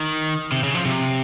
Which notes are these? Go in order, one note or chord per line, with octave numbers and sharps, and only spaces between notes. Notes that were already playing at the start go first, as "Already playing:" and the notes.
Already playing: D#3
C3
C#3
F3
C3